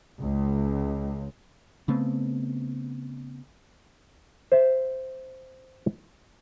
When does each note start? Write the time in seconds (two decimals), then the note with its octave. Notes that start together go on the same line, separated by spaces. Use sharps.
0.20 C#2
1.88 C#3 A3 B3 C4
4.52 C5 E5